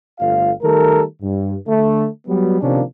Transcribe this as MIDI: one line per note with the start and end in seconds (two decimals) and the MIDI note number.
0.20 0.51 31
0.20 0.51 57
0.20 0.51 65
0.20 0.51 77
0.62 1.02 51
0.62 1.02 55
0.62 1.02 57
0.62 1.02 69
0.62 1.02 70
1.22 1.56 43
1.67 2.07 50
1.67 2.07 57
2.28 2.60 54
2.28 2.60 55
2.28 2.60 59
2.62 2.81 48
2.62 2.81 51
2.62 2.81 53
2.62 2.81 58
2.62 2.81 61
2.62 2.81 62